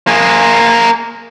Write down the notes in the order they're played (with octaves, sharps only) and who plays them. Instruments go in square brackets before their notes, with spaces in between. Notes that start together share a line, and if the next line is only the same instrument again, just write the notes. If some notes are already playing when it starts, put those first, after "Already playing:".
[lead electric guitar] A#3 G#4